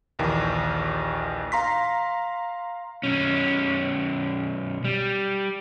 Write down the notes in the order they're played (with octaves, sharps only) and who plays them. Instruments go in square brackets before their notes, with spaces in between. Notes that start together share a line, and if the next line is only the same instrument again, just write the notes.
[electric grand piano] A#1 D#2 D#3 E3
F5 A#5 C6 B6
[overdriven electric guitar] B1 C#4
G3